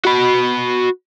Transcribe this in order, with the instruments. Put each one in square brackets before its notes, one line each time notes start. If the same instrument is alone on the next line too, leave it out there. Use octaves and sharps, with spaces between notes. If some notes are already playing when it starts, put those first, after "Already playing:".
[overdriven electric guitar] F#4 B5